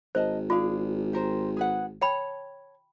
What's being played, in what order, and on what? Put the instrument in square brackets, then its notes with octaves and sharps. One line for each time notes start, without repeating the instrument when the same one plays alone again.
[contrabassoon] G#1 [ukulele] A#4 D#5 A5 [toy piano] C5
[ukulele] D4 G#4 F5 [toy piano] F4
[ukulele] G4 A#4 C5
G#4 B4 F#5
[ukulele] C#5 A5 [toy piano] G5 B5